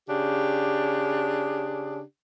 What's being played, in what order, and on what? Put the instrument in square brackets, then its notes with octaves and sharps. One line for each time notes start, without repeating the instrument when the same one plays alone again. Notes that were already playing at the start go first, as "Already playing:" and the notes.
[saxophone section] C#3 D4 G4